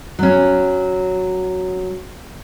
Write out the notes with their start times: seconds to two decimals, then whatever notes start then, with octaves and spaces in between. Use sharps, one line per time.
0.19 F#3 C#4